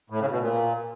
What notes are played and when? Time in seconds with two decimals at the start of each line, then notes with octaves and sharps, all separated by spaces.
0.10 A2
0.20 C#3
0.30 B2
0.40 A#2